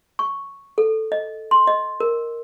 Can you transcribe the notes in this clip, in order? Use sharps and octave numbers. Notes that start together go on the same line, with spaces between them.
C#6
A4
D#5
C6
D#5
A#4